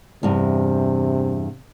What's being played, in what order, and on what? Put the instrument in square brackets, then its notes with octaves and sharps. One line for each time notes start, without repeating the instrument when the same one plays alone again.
[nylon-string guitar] E2 G2 [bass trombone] C3